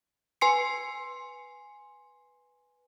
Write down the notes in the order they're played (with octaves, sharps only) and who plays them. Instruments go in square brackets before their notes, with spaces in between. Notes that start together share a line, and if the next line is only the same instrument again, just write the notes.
[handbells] B4 G#5 C6 C7 C#7